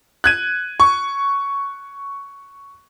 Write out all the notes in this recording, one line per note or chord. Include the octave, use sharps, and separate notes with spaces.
F#6 G#6 D#7
C#6